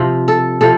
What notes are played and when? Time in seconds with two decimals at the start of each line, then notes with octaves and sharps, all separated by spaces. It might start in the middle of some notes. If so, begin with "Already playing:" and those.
Already playing: C3 F3
0.28 A4
0.61 C3 F3 A4